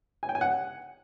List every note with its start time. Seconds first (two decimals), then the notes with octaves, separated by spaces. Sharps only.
0.23 G#5
0.29 G5
0.35 G#5
0.41 F#5